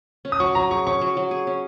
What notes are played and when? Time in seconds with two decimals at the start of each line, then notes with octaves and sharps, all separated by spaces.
0.25 C#4
0.32 D#6
0.40 F#3 C#6
0.55 F#3 A#5
0.71 G#4 C#6
0.87 C#4 C#6
1.01 F#3
1.17 F#3
1.31 G#4
1.47 C#4